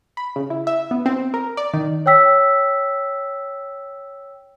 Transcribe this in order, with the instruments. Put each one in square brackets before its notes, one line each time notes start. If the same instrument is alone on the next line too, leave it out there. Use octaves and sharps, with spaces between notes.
[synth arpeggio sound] B5
C#3
E4
E5
B3
C4
A#4
D5
D#3
[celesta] C#5 G5 E6 B6